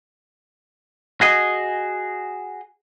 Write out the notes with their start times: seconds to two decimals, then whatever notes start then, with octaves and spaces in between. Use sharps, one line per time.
1.21 F#4 G#4 D#5